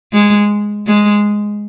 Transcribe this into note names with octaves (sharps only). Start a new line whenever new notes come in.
G#3
G#3